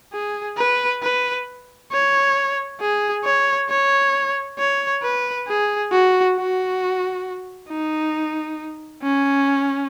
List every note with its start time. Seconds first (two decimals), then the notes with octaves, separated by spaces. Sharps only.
0.13 G#4
0.58 B4
1.03 B4
1.92 C#5
2.81 G#4
3.25 C#5
3.70 C#5
4.59 C#5
5.03 B4
5.48 G#4
5.92 F#4
6.37 F#4
7.69 D#4
9.03 C#4